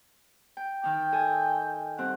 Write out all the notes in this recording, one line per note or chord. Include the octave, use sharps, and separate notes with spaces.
G5
D#3 D#4 G5
A4 D#5 G#5
G2 C4 F#5